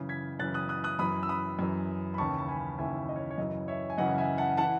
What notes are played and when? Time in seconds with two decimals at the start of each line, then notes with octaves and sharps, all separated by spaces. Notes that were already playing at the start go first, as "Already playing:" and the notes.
Already playing: F#2 C#3 E3
0.09 G#6 B6
0.39 F#2 C#3 E3 F#6 A6
0.54 D#6 F#6
0.69 D#6 F#6
0.84 D#6 F#6
0.99 F#2 E3 B5 D#6
1.23 E6
1.29 B5 D#6
1.59 F#2 E3
2.14 B5
2.18 D#2 C#3 E3 A5 C#6
2.38 A5
2.48 G#5 B5
2.78 D#2 C#3 E3 E5 G#5
3.09 D#5
3.16 C#5
3.31 C#5
3.38 F#2 C#3 E3 D#5
3.68 C#5 E5
3.90 G#5
3.98 F#2 C#3 E3 D#5 F#5
4.18 E5 G#5
4.38 F#5 A5
4.57 E3 F#5 A5